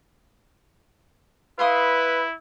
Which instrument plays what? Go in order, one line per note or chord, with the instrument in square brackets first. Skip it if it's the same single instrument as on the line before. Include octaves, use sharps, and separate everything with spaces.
[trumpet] E4 [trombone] B4 [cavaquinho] F5 C6 D#6